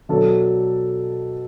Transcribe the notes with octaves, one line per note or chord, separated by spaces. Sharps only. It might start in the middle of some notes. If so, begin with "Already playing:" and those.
B2 F#3 D4 F#4 A4